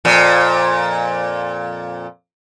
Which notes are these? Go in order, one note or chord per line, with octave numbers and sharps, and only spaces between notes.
F2 A#2